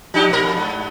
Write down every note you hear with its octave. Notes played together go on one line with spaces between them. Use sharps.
F3 D#4 G4
B2 A#4
F2
G#2